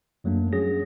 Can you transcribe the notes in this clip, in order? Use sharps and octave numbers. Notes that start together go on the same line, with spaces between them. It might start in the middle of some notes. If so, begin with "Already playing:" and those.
F#2 F#3 A3 A#3 D4
F#3 C#4 G#4 A#6